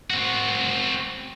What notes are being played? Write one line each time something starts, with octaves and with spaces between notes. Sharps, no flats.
C4 F#4